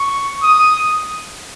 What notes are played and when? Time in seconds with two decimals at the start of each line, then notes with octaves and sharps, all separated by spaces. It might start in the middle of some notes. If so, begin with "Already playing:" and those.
Already playing: C#6
0.43 D#6